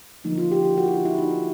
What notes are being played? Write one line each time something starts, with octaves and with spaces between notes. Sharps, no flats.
D3 F3 A#3 D#4
F4
G4
G4
F#4
E4
F4
E4
D#4